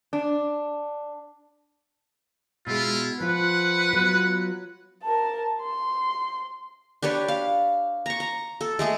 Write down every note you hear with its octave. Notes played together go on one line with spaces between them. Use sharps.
D4
B2 G#3 E4 F4
F3 F4 B4 F#5
F#3 B3 F4
A#4 A5
C6
D4 G4 B4 C#5
F5
A#5 C#6
A#5
A4
G#3 A3 G#4